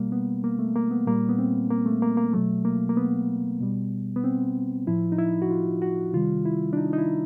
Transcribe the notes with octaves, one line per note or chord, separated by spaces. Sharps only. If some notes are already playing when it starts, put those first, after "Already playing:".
Already playing: B2 G3 A#3
B3
A#3
A3
A#3
B3
A#2 G3 A#3
B3
C4
A#3
A3
A#3
A#3
B2 F#3 A3
A#3
A#3
B3
B2 G3
B3
C4
A2 F3 E4
D#4
E4
F#4
F4
F#4
C3 D#3 G3 F4
E4
D4
D#4
D#4
E4